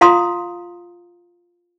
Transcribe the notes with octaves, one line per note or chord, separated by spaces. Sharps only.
F4 F5 A#5 C6 D#6